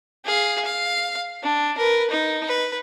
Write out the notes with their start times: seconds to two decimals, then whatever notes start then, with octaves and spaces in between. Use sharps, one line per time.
0.25 G#4 F5
0.65 F5
1.43 D4
1.78 A#4 B4
2.11 D#4
2.48 B4